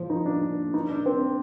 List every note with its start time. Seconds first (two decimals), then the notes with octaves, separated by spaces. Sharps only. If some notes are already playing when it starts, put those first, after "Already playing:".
Already playing: F3
0.10 D#4
0.26 D4
0.74 D#4
0.90 D4
1.06 C4